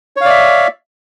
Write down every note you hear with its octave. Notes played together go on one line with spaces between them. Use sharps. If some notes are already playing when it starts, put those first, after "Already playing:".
C#5 D5 E5 F5